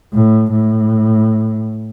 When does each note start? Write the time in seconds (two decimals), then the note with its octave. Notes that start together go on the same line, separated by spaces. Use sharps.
0.14 A2
0.52 A2